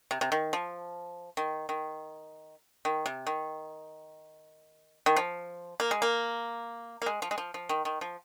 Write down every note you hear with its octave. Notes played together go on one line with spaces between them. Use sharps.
C3
C3
D#3
F3
D#3
D#3
D#3
C3
D#3
D#3
F3
A#3
G#3
A#3
A#3
G#3
F3
G#3
F3
F3
D#3
D#3
F3